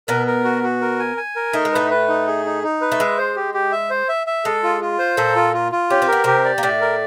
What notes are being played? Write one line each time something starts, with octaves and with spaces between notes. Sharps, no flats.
B2 B3 A#4
A#4
F#4
F#4
A#4
G#5
G#5
A#4
A3 D#4
G#3
A2 A3 B4
B4
D#4
G#4
D#4
D#4
B4
A3
G#3 E5
C5
G4
G4
E5
C5
E5
E5
G#3 A4
F4
F4
C5
A#2 A#3 A4
F4
F4
F4
C#4 G4
C4
B3 A#4
C3 C4 G4
D5
A#3
A2 A3 D5
A#4